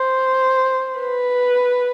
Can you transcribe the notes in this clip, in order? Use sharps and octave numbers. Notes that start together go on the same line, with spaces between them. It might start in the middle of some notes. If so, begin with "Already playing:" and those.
Already playing: C5
B4